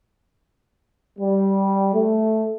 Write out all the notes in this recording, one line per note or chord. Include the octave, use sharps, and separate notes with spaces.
G3
A3